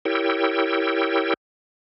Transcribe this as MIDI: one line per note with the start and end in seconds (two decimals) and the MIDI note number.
0.05 1.34 64
0.05 1.34 67
0.05 1.34 70
0.05 1.34 73
0.05 1.34 79
0.05 1.34 88